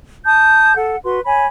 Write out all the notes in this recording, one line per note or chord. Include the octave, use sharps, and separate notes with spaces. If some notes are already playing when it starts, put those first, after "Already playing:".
A5 D#6 G6
A4 F#5
F#4 B4 C6
C#5 G#5 B5